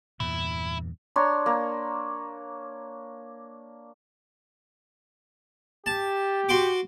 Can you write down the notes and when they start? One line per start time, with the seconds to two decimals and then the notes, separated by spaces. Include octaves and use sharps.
0.20 E2 G2 A#2 E4
1.16 D4 C#5 A#5 C6
1.46 A#3
5.86 G4 A5
6.49 F#4 C6 D6